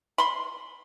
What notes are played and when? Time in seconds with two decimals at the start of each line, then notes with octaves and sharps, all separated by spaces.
0.18 B5 C6